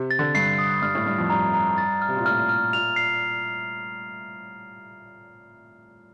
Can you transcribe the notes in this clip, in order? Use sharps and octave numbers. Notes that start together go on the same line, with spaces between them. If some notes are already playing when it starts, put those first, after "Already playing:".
Already playing: C3
A6
D3
G2 C7
D#6
G2 F6
A2
G2 F6
F2
G2 A#5
A#5
A6
F6
C3
A#2
A2 F6
F6
A#2 F7
C7